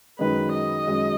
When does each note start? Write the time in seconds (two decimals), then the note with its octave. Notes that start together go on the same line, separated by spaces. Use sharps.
0.19 F#2 D#3 G#3 B4
0.53 D#5
0.87 F#2 D#3 G#3